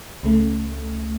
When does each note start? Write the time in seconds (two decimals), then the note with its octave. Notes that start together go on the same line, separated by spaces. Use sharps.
0.23 C#2 C#3 A3